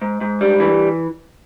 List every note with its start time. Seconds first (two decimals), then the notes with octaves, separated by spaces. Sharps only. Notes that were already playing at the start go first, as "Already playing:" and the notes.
0.02 G#2
0.21 G#2
0.41 G3
0.60 E3